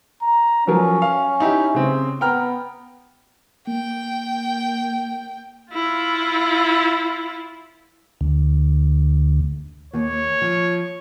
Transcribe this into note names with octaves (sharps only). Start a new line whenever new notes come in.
A#5
F3 F#3 C#4 A#4
F5
D#4 E4 G4
C#3 C4
B3 G5 A#5 F6
A#3 G5
E4 F4
D2
D#2 C#5
F3